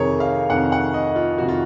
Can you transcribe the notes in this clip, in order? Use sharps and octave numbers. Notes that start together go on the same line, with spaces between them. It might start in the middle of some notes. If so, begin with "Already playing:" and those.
Already playing: F2 C3 D#3 G#4 A#4 C#5
F5
F2 C3 D#3 F#5
F#5
D#5
F4
F2 C3 D#3 F#4
F4